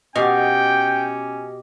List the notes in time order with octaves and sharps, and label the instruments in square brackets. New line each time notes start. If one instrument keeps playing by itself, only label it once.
[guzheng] B2 [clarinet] C#4 [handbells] G4 D#5 [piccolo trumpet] G5